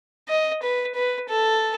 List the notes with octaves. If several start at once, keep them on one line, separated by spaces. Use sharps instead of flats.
D#5
B4
B4
A4